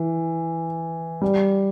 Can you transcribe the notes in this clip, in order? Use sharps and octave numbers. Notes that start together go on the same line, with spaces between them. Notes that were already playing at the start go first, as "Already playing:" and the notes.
Already playing: E3
G3